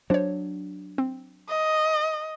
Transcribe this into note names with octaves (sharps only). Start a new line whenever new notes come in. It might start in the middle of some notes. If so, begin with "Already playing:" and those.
F#3 D4 C5 C#5
C4
D#5